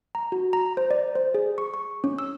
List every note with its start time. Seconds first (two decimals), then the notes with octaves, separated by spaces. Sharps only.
0.15 A#5
0.32 F#4
0.53 A#5
0.77 C5
0.91 D5
1.15 C5
1.34 G#4
1.58 C#6
1.74 C#6
2.04 C#4
2.19 E6